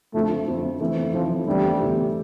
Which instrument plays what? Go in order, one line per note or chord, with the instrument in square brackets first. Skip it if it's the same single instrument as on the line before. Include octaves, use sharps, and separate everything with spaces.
[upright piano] F2 D3 F3 C4 [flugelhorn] A3
[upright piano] F2 D3 F3 C4
F2 E3 A3 C4
[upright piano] F2 E3 A3 C4 [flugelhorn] F3
[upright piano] E2 D3 A3 C4 G4 [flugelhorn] G3
[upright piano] E2 D3 A3 C4 G4